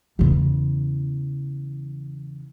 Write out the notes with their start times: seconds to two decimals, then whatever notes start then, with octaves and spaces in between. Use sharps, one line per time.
0.19 E2 C#3